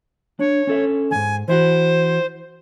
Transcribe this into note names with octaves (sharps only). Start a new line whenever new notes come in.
D4 C#5
C#4 A4 E5
D#2 G#2 G#5
E3 E4 F#4 C5